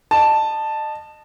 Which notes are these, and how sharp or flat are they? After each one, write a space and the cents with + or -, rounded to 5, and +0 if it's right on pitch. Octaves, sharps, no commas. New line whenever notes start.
D#5 -30 A5 +0